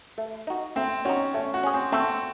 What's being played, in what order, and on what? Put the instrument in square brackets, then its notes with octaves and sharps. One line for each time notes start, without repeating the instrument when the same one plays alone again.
[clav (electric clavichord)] A3
D#4 F#4
[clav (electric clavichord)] A3 [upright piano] C4
[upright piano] C#4 [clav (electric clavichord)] D#4 F#4
[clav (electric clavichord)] A3 [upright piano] C#4
[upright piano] F#4
[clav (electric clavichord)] C#4 G#4
[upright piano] C4
[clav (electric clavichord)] A3 [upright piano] C4